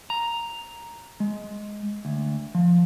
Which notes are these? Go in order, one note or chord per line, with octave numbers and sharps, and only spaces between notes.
A#5
G#3
D2
F3